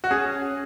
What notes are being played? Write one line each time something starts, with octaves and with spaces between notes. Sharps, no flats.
F#4
C#4 G#4